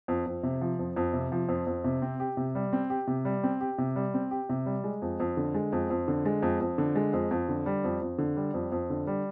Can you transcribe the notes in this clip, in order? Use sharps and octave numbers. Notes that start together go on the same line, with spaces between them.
F2
F2
C3
F3
F2
F2
C3
F3
F2
F2
C3
C4
G4
C3
G3
C4
G4
C3
G3
C4
G4
C3
G3
C4
G4
C3
G3
G#3
F2
F2
D3
G#3
F2
F2
D3
G#3
F2
F2
D3
G#3
F2
F2
D3
G3
F2
F2
D3
G3
F2
F2
D3
G3